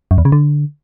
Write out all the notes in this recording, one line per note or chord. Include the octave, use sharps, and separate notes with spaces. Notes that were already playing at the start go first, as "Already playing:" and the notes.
F#2
E2
C#3
D3